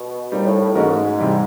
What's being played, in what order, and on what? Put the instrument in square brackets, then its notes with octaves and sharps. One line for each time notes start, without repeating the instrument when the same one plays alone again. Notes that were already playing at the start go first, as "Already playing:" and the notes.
Already playing: [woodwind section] B2
[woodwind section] A#2 [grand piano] G3 C4 D#4
[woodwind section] A2
A2
[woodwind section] G#2 [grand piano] E3 A3 C#4 F#4 A#4
[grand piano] C3 E3 G3